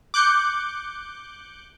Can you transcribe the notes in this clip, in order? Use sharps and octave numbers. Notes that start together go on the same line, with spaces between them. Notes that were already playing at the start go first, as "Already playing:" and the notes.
D6 F#6 G6 C#7